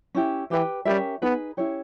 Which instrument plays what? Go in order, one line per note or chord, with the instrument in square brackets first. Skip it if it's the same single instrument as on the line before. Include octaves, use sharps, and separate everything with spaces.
[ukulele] C#4 E4 G4
[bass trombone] E3 [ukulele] G4 B4 G5
[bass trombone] G3 [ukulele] C#4 G4 A#4 E5
[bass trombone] B3 [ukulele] D#4 G#4 B4
[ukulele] C#4 E4 G4 C#5